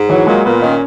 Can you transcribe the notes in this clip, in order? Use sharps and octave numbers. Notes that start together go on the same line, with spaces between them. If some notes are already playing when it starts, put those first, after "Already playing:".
Already playing: G#2
E3 F#3
A#2 G#3
A#2 B3
D#3 C#4